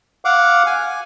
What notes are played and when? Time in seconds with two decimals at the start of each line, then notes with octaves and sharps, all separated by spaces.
0.25 F5 F#5 D6
0.66 G#5